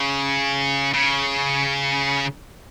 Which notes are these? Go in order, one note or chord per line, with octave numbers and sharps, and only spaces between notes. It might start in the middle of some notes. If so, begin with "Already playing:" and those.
Already playing: C#3
C#3